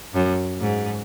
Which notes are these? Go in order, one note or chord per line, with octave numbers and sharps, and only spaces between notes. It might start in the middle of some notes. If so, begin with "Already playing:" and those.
F#2
G#2